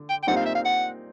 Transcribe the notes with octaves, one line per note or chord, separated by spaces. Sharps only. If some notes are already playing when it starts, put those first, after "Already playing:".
Already playing: D3
G5
G5
A#2 G3 C4 D#4 F#5
F5
E5
F5
F#5